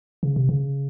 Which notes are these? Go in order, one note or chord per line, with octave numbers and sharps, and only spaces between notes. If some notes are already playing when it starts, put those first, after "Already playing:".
C#3
C3
C#3